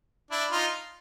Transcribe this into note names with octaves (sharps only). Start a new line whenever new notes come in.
D4 E4
D#4 F4